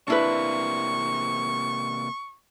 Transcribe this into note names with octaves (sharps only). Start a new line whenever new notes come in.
C3 A#3 D4 E4 B4 C#6